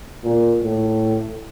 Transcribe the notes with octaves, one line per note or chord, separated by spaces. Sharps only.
A#2
A2